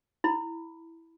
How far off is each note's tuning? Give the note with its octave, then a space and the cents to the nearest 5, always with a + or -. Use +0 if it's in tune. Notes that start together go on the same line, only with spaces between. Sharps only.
E4 +0 B5 +0